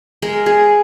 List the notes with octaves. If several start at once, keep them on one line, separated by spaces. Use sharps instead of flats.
G#3 A#4
G#4